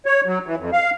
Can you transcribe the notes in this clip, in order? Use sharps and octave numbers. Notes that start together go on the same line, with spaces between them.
C#5
F#3
E3
F2
F5